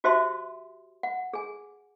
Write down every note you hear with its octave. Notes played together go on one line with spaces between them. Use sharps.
F#4 G4 C5 E5 A5 C6
F#5
G#4 G#5